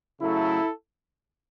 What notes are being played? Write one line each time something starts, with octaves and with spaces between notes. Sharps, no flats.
C#3 F#3 A3 E4 A4